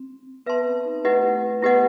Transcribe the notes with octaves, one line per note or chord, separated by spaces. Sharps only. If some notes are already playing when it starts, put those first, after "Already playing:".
Already playing: C4
B3 B4 E5 A5 C6
C4
D#4
A3 E4 G4 B4 D#5 F#5
B3 E4 G4 B4 D#5 F#5